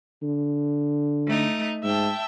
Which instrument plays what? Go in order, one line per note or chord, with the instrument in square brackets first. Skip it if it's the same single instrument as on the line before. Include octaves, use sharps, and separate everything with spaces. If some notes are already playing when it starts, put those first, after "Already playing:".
[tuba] D3
[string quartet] A3 D#4
[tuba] G#2 [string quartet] E5 G5 A5